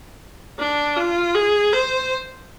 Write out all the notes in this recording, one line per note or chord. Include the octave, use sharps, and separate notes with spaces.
D4
F4
G#4
C5